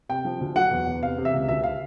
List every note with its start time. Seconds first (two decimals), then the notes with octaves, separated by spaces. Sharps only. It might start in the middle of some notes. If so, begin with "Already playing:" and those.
0.09 C3 G5
0.25 F3
0.41 D2
0.56 F#3 F#5
0.71 E2
0.87 E2
1.02 C3 F5
1.18 C3
1.25 E5
1.34 C#2
1.48 D2 E5
1.64 F5